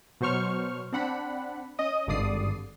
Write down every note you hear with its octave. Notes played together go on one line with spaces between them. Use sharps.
B2 F#3 C5 C#6 F6
C4 D4 F#5 B5
C#4 D#5 D#6
G#1 G2 D3 D5 D#6 C7